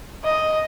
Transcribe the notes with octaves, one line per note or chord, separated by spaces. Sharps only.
D#5